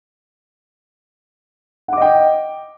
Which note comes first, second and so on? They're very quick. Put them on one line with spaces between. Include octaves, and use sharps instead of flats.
F#5 D6 D#5 G5